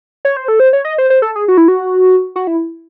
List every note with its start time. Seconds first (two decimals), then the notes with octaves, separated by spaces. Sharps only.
0.25 C#5
0.37 C5
0.48 A4
0.60 C5
0.73 C#5
0.85 D#5
0.98 C5
1.10 C5
1.22 A4
1.36 G#4
1.48 F#4
1.58 E4
1.68 F#4
2.36 F#4
2.47 E4